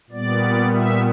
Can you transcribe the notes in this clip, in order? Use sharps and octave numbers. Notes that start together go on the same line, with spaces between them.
A#2 G3 B3 D5
E5